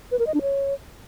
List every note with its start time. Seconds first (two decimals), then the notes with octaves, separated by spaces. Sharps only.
0.12 B4
0.19 A#4
0.27 D#5
0.34 D4
0.42 C#5